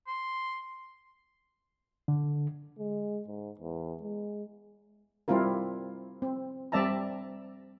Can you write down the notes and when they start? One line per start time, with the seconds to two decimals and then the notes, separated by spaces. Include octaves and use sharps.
0.07 C6
2.08 D3
2.78 G#3
3.28 G#2
3.59 E2
4.02 G#3
5.28 G3 C4 E4 F4 A#4
6.22 C4
6.72 G3 C4 D5 E5 A5 A#5